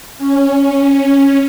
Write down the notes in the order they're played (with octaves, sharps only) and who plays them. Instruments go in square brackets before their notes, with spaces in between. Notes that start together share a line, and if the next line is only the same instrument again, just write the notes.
[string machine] C#4